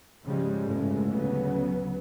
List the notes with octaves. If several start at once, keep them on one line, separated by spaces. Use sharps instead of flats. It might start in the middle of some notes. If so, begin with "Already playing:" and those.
G#2 C#3 F3 G3 G#3
G1 A2 C#3 G#3 A3
D2 C#3 F#3 B3